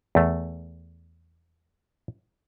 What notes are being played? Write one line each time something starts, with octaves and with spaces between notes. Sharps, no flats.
E2 A3